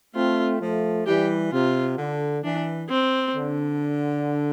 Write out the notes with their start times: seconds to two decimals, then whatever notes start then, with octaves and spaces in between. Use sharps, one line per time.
0.15 A3 C4 F4
0.60 F3 A3
1.07 E3 G3 G4
1.52 C3 F4
1.98 D3
2.44 E3 D4
2.90 C4
3.35 D3